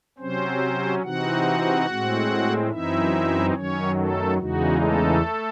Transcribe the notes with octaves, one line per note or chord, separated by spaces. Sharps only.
C3 F#3 C4 C#4 C5
C3 E3 C4 D#4 F#4 F#5
A2 G#3 C4
F#2 E3 C4 D#4 E4 E5
F#2 D#3 F#3 C#4 C#5
A3 A4
E2 C#3 E3 G#3 D#4 F#4
A3 A4